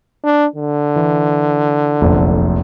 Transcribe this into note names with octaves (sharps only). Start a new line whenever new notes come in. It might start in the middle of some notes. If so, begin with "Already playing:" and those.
D4
D3
E3
F1 A#1 F#2